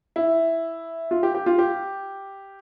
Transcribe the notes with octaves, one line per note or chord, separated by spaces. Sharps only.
E4
F4
G4
G4
F4
G4